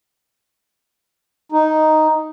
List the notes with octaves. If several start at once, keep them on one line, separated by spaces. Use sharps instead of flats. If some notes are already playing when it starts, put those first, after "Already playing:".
D#4